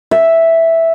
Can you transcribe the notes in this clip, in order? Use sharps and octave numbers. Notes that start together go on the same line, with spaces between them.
E5